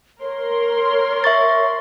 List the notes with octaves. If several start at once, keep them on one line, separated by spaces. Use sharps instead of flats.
A#4 C#5 C6
E5 C#6 A6